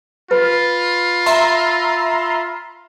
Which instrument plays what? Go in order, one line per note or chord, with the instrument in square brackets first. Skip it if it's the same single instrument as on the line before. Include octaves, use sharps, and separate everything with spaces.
[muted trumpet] F4 [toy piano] B4 [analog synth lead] B5
[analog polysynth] E5 A#5 C6